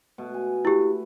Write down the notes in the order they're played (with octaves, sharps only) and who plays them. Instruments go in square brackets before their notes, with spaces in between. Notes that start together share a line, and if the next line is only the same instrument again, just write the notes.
[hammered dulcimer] B2 A3
G#5
[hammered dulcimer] A3 B4 [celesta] E4 G4